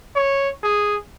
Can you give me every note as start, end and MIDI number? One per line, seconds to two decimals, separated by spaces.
0.16 0.49 73
0.63 0.96 68